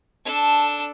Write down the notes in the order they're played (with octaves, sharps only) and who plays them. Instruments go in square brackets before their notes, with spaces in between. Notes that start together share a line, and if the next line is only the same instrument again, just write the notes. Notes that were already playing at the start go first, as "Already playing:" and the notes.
[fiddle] D4 A4